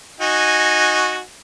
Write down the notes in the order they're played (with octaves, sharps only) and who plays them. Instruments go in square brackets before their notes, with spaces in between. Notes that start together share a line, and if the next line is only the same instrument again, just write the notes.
[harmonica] D#4 F#4 G#5